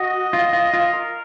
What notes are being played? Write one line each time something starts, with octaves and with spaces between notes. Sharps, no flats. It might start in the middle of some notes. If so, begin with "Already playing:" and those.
Already playing: F#4 D#5
F4
F4
F4
A#4